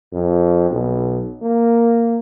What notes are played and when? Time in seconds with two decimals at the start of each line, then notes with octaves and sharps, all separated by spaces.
0.13 F2
0.71 B1
1.42 A#3